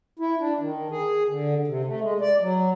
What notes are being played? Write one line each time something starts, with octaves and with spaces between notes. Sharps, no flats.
E4
D4
D#3
G#4
D3
C3
A3
G#3
D5
F#3